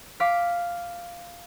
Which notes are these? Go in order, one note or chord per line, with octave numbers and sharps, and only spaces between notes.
F5 D6 F6 B6